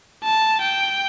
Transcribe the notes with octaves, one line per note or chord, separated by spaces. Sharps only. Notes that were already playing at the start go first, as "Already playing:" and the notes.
A5
G5